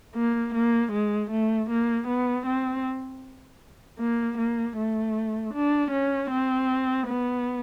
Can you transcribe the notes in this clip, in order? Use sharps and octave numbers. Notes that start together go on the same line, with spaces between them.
A#3
A#3
G#3
A3
A#3
B3
C4
A#3
A#3
A3
D4
C#4
C4
B3